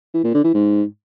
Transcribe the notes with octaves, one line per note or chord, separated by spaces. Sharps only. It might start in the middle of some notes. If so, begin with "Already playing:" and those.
E3
A#2
D3
E3
G#2